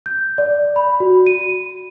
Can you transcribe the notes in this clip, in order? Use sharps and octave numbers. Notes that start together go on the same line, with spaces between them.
G6
D5
B5
F#4
D#7